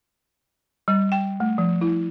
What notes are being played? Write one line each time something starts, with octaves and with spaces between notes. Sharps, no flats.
G3
G5
A3
F3
E4